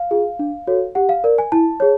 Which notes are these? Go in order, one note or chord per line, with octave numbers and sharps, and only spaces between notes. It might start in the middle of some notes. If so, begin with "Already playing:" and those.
Already playing: F5
F4 G#4
D4
F#4 A4 C#5
G4 F#5
F5
A#4 D5
G#5
E4 A5
G#4 C#5